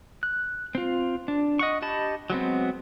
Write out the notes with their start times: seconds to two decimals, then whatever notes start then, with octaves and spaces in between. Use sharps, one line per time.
0.23 F#6
0.75 C4 F4
1.28 D4
1.59 D#5 F#5 C#6
1.82 G4 D#5 A5 B5
2.30 F#3 G#3 B3 C4